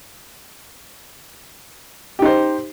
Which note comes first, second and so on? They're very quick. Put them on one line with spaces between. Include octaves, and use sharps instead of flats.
G4 D#4 C5